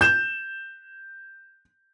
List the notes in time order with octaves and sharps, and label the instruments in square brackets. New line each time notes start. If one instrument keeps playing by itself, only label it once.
[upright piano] G6 E7